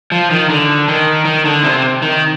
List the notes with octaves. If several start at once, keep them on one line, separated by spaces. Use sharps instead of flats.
F3
D#3
D3
D#3
D#3
D3
C3
D#3